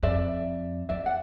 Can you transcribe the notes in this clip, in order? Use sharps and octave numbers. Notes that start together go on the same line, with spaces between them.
F2 D5 E5
F2 D5 E5
F#5